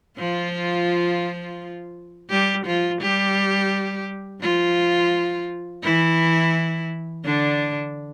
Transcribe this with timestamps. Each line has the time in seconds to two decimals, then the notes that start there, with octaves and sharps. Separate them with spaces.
0.18 F3 F4
2.30 G3 G4
2.66 F3 F4
3.01 G3 G4
4.42 F3 F4
5.83 E3 E4
7.25 D3 D4